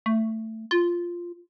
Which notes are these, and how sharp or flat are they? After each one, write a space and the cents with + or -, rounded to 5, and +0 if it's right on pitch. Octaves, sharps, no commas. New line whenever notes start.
A3 +15
F4 -5